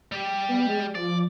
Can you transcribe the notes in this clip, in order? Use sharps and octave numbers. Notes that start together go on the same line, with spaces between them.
G3 G4
B3
G#3
F3 D5